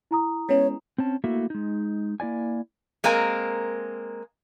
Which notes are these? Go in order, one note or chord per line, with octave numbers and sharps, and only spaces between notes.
E4 A#5 D#6
G#3 B3 C#4 C#5
C4 C#4 A5
A3 A#3 E4 F#4 E5
G#3 D#4
A#3 E4 D5 G#5
G#3 A#3 C4 A#4 G#5